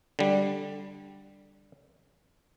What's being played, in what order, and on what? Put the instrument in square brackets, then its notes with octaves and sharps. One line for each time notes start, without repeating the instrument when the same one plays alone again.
[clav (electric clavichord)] D3 G3